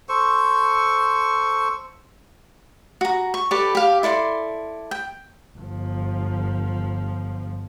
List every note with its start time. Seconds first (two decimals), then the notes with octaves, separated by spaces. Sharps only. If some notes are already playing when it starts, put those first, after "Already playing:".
0.09 A4 C5 C#6
3.01 F#4 A#5
3.34 C#6
3.51 G4 A4 B4 D5
3.75 G4 F5
4.03 E4 A4 D5 C6
4.91 G5
5.58 G1 F3